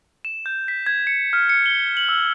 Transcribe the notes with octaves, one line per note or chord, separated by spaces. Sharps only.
E7
G6
B6
G#6
C#7
F6
C#7
G7
F#7
E6